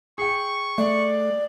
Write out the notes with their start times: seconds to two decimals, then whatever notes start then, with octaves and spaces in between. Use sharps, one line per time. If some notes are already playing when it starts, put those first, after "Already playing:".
0.18 G#4 G5 C#6
0.78 A3 D5